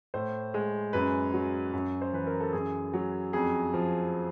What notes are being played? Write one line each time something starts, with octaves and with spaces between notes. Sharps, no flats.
A2 C5
G#3
F#2 B4
F#3
F#2
C5
E3 B4
A#4
A4
F#2 G#4
F#3
F2 G#4
F3